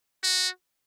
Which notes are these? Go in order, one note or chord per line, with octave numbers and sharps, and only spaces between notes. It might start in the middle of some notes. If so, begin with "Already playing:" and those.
F#4